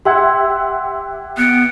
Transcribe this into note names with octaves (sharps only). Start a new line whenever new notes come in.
G4 E5 F#5 C6 E6 G#6
B3 F#6 C#7 D7